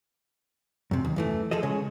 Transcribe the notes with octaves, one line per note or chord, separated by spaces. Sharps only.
F#2 C3
D#2
F#2 E3 A3
F3 G#4 A4 D#5
C#3 G#3 C#5